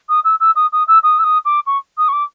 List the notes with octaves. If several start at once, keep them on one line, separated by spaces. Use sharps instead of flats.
D#6
E6
E6
D#6
D#6
E6
D#6
E6
D#6
D6
C#6
D#6
C#6
D6